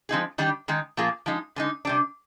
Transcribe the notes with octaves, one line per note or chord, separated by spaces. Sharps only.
F3 G#3 C4 D#4 G#4
D#3 G3 D4 G4
D#3 G#3 D#4
A#2 F3 A#3 F4 G#4
F3 G#3 D#4
D3 G#3 D#4
C3 G3 D4